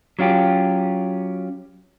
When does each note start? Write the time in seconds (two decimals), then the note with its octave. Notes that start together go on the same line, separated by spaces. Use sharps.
0.19 F#3 C#4 F4 G4